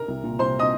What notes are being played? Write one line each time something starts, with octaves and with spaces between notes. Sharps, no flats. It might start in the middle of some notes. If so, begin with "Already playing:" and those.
Already playing: A#4 A#5
C2
A#2
C2 C5 C6
D#5 D#6